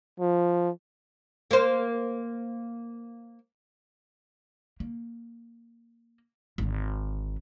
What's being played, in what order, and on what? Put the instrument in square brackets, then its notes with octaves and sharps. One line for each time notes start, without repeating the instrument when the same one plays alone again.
[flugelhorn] F3
[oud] A#3 C5
[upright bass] A#3
G#1 D3